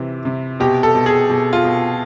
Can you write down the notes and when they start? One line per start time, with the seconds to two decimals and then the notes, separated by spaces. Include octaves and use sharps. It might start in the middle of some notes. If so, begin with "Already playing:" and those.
Already playing: C3 E3
0.25 C3
0.60 B2 G4
0.83 A4
0.95 B2
1.06 G#4
1.29 B2
1.53 F4
1.64 B2